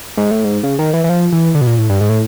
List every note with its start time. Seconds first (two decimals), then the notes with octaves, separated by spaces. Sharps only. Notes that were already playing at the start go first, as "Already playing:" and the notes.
0.17 G#2
0.31 A2
0.44 G#2
0.63 C#3
0.79 D#3
0.93 E3
1.04 E3
1.09 F3
1.32 E3
1.55 D3
1.61 B2
1.67 A#2
1.78 A2
1.89 G2
2.01 G#2
2.09 A2